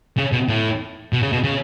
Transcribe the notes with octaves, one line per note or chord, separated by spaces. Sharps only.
C#3
B2
A2
B2
C#3
B2
C#3